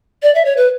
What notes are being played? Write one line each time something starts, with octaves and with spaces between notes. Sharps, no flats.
D5
E5
C#5
B4